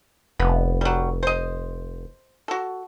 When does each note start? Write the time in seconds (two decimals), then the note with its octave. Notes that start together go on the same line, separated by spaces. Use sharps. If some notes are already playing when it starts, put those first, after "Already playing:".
0.39 F1 B3
0.81 F#3 G3
1.23 C5 D#5
2.48 F#4 A4